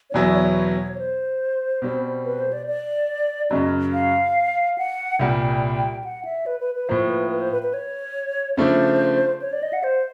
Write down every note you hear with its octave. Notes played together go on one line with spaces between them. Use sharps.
C#5
E2 B2 F#3 B3 E4 D5
C#5
C#5
C5
B2 G3 C4
B4
C5
D5
D5
F#2 C#3 F#3 D#5
F5
F#5
C2 A#2 G3 G5
F#5
E5
B4
B4
B4
A2 F3 A#3 C5
B4
B4
C5
B4
B4
C#5
C#3 F3 A3 D4 C5
C#5
D5
D#5
F#5
C5